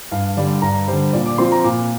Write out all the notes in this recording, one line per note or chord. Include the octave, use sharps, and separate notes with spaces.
G2 F5
D3 G3 D5
G2 A#5
D3 G3 C5
A#2 D5
D6
F3 C4 F4 C6
A#5
A#2 D6